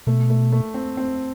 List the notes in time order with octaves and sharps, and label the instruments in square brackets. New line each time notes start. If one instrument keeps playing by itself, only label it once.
[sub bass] B2 [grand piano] A3
[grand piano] A3
A3
C4
C4